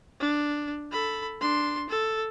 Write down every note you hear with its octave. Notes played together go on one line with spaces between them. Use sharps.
D4
A4 B5
D4 C6
A4